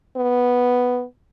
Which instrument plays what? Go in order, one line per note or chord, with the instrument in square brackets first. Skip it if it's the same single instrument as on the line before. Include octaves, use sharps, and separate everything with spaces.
[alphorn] B3